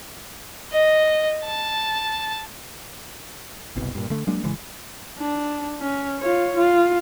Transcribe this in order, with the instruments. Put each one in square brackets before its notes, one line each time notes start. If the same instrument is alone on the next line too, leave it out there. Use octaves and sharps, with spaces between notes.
[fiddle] D#5
A5
[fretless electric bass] F#1 C2 B2
G2 A#2
D3 A3
F#3 G#3 A#3 D4
A1 C#3 E3 G#3
[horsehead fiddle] D4
C#4
F4 C#5
F4